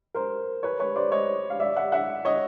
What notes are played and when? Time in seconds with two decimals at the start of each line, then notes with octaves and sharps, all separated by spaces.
0.14 A#4 C5
0.63 B4 C#5
0.80 B4 C#5
0.96 C5 D5
1.11 C#5 D#5
1.50 F5
1.60 D5 E5
1.76 E5 F#5
1.92 E5 F#5
2.25 C#5 D#5